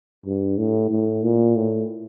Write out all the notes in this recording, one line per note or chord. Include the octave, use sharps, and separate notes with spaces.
G2
A2
A2
A#2
A2